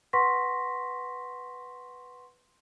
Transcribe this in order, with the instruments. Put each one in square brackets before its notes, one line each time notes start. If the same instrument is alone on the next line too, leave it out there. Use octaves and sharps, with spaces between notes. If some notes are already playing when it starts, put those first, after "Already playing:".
[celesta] B4 F#5 C6 C#6 A#6 B6